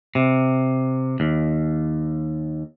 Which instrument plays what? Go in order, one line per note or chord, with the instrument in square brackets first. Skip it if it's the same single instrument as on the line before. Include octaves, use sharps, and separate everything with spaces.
[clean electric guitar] C3
D#2